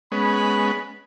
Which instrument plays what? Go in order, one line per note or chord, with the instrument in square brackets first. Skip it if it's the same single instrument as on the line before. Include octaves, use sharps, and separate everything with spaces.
[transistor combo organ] G#3 B3 C#4 [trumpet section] B5